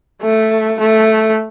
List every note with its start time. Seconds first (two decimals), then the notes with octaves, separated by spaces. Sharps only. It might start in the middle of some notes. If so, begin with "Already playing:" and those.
0.22 A3
0.80 A3